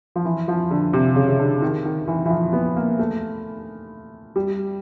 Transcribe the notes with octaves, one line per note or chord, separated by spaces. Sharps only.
F3
E3
F3
D3
C3
C#3
C#3
D3
D#3
D#3
E3
E3
F3
B3
A#3
A3
G3